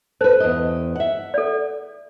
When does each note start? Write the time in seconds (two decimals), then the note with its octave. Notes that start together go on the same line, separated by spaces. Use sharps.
0.21 A4 B4 C5
0.40 E2 D#5
0.95 E5 F#5
1.34 A4 D5